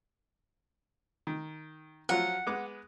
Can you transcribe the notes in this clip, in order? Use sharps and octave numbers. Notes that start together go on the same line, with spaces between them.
D#3
F3 F#3 F4 F#5
G#3 B3 D6